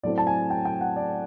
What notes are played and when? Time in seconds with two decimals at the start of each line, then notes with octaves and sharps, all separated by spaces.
0.03 A2 F#3 A3 C4 E4 D5
0.18 A5
0.27 G#5
0.50 G5
0.65 G5
0.81 F#5
0.96 D5